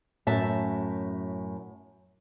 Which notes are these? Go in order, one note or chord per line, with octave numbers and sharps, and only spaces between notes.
F#2 A2 E5 A5